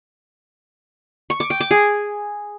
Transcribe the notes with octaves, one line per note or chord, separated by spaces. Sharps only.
C#6
D6
G5
D6
G#4